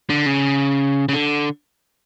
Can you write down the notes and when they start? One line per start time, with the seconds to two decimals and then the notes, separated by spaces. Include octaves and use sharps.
0.10 D3
0.26 C#3
1.09 C#3
1.13 D3